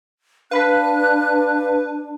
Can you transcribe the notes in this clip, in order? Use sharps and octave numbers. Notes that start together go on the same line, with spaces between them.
D4 B4 F5 B5 F#6 B6